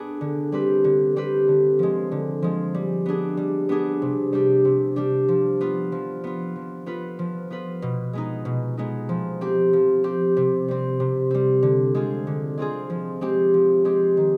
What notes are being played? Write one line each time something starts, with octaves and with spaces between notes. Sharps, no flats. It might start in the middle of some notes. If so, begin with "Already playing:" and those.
Already playing: B3 D4 G#4
D3
G3 C4 G4 B4
D3
G3 C4 G4 B4
D3
F3 G#3
D3
F3 G#3
G3
B3 D4 G#4
G3
B3 D4 G#4
C3
G3 D4 G4
C3
G3 D4 G4
F3
B3 F4
F3
B3 F4
F3
B3 F4 B4
F3
B3 F4 B4
B2
G#3 B3 D#4
B2
G#3 B3 D#4
F3
C4 G4
F3
C4 G4
C3
G3 C4
C3
G3 C4
D3
G#3 C4 F4 G#4
D3
G#3 C4 F4 G#4
F3
G#3 C4 G4
F3
G#3 C4 G4
D#3